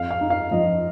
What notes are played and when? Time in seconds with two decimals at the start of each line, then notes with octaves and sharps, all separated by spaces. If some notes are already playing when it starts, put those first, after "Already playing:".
Already playing: F2 F5
0.11 F5
0.21 D#4
0.30 F5
0.51 F3 D#5